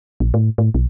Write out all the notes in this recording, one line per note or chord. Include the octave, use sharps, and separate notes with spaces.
A#1
A2
A2
B1